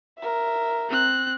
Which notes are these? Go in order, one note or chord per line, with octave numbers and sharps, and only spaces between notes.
A#4 E5
C4 F#6